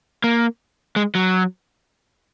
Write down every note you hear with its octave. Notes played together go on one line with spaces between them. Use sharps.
A#3
G#3
F#3